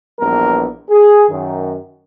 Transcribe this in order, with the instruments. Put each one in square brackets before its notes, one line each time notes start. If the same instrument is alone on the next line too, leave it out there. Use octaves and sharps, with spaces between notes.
[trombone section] A#1 E3 G3 B3 A#4
G#4
F#2 D#3